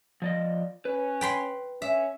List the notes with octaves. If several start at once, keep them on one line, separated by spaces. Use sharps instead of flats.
F3 D5 D#5
C#4 B4
G5 B5 C6
C#4 E5